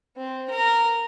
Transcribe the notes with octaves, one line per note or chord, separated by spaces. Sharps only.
C4
A#4